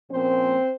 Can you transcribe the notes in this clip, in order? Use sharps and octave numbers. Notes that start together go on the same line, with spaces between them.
A#2 F3 A#3 C4 C#4 C5